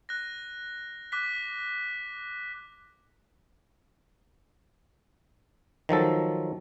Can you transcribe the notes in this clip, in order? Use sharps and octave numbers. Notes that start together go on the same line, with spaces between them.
F#6 A#6
D6 F#6 B6
D#3 F3 F#3 A4